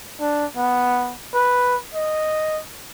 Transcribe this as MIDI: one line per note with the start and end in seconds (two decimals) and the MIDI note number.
0.20 0.46 62
0.56 1.15 59
1.34 1.76 71
1.95 2.60 75